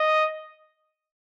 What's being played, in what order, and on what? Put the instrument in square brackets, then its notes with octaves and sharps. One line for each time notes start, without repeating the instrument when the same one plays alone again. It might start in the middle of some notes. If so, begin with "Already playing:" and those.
Already playing: [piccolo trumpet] D#5